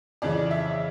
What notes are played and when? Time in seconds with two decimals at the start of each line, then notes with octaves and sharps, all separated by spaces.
0.22 F2 C#3 E3 D5
0.51 E5